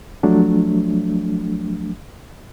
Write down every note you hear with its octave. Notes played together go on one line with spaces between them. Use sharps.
F3 F#3 A3 D4